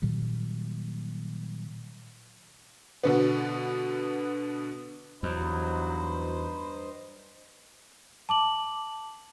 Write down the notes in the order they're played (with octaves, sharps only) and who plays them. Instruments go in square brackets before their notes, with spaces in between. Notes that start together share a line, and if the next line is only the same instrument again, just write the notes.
[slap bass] A#2 D#3 F#3 G3
[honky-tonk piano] B2 D3 B3
[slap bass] E2 [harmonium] G2 C5 D#5 [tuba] F#3 [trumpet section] D#4 B5
[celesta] A5 D6 F#7